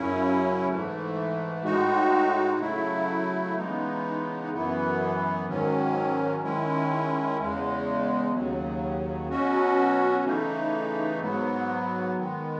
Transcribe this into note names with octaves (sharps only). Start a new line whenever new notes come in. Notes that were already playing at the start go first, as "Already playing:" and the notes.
Already playing: F#2 C#3 F#3 C#4 E4
G#2 E3 A3
A2 G#3 D#4 F#4
C#3 F#3 A3 E4
C#3 E3 G#3 B3 D#4
F#2 E3 B3
G#2 D#3 F#3 C#4
D#3 G#3 C#4 E4
E2 C#3 G#3
D#2 C#3 F#3
B2 F#3 C#4 F#4
C#3 E3 A3 D#4
G#2 F#3 B3
D#3 G#3 B3